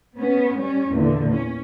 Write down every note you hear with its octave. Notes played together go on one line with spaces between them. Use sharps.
B3 C#4
G3 C#4
E2 A#2 D3
C#4